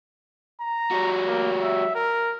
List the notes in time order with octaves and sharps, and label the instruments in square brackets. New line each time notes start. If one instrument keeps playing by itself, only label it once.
[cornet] A#5
[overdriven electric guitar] G3 F#4
[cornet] A#3
E5
A#4